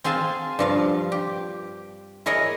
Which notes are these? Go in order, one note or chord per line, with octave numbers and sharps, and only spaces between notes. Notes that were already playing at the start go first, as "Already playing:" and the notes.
C4 G#4 F5 G#5 A5
G2 F3 F5
G4
E4 G#4 A#4 C#5 D#5